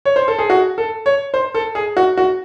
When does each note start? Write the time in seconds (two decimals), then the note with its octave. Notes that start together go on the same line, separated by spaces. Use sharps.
0.05 C#5
0.16 C5
0.28 A4
0.39 G#4
0.50 F#4
0.78 A4
1.06 C#5
1.34 C5
1.54 A4
1.75 G#4
1.97 F#4
2.17 F#4